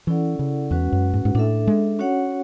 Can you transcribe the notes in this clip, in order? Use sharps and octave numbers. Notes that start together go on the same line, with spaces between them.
E3 C#4 E4 A4 D5 F#5
C#3
E2 G#3 C#4 F#4 B4 F#5
F#2
G#2
G#2
A2 D4 A4 E5
G#3
C#4 F#4 C#5 F#5